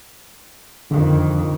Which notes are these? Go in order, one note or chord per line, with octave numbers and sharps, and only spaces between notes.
F2 D3 D#3